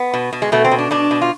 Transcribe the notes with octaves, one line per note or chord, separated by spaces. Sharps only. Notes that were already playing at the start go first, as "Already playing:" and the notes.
Already playing: B3
B2
B2
G#3
B2 A3
C4
B2
D4
B2 D4
B2
F4